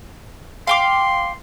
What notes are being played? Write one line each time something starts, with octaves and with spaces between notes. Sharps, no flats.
F5 G5 C6 D6